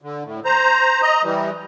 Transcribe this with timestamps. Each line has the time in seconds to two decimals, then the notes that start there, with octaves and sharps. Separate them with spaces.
0.02 D3
0.24 A2
0.45 C5 A#5
1.02 D#5 A#5
1.23 E3 G3